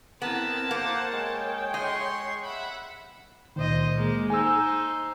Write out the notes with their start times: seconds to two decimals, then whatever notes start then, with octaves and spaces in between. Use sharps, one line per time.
0.22 B3 C4 E4 A#4 A5
0.71 A#3 C5 F#5
1.12 G#3 C#5 G5
1.74 D#5 C6 C#6
2.44 E5 F#5 B5
3.56 C#2 A#2 D#3 C5 D#5
3.94 G#3 A#3
4.30 D#4 C5 G#5 E6